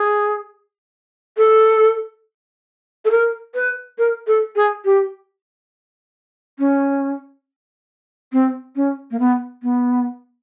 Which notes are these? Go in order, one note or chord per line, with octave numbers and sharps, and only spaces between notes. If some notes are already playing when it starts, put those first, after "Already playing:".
Already playing: G#4
A4
A4
A#4
B4
A#4
A4
G#4
G4
C#4
C4
C#4
A#3
B3
B3